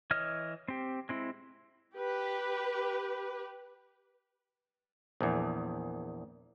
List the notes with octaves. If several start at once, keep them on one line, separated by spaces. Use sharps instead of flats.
E3 C#5 D#5 F6
C4 G4
G#3 C4 E4
G4 B4
A#1 E2